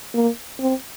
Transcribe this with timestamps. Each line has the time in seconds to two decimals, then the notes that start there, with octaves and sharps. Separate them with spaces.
0.14 A#3
0.59 C4